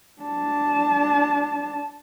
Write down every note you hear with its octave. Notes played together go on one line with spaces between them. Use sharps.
D4 A5